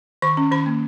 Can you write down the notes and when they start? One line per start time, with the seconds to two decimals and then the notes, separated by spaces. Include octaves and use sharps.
0.22 D#3 C#6
0.37 C#4
0.51 D#3 B5
0.66 A#3